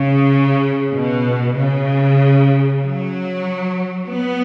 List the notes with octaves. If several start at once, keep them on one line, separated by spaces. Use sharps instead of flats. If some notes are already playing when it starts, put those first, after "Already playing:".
Already playing: C#3
B2
C#3
F#3
B3